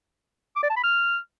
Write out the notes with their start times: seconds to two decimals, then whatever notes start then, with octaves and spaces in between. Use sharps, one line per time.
0.56 D6
0.63 D5
0.70 A5
0.76 B5
0.83 F6